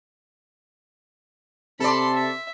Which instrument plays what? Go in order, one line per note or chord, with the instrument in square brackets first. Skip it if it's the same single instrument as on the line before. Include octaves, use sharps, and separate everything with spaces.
[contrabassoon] C3 [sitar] A4 D5 [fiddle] B5 C6
[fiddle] E5